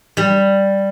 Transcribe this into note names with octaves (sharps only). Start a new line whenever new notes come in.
G3